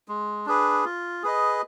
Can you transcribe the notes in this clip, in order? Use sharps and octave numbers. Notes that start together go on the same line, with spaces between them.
G#3
D4 G#4 B4
F4
G#4 B4 D#5